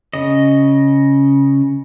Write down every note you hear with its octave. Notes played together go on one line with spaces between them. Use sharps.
C#3 D#5